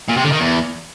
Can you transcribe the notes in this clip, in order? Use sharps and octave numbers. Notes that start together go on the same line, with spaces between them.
A#2
C3
D3
D#3
E2